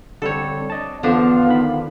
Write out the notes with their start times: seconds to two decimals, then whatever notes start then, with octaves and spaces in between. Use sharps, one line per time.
0.22 D3 G3 C4 A4 C#5
0.70 D5 D#5 A5
1.03 E2 D3 F3 B3 D4 F4 F5 F#5
1.47 D#3 B5